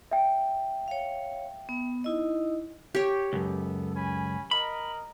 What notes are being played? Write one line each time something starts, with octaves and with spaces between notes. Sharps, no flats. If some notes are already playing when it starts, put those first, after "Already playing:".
E5 G5
C#5 F5
B3
D#4 E4 D#5
G4 C#5
C#2 F#2 B3 A4
C#4 G#5 B5
A#4 D#5 A#5 B5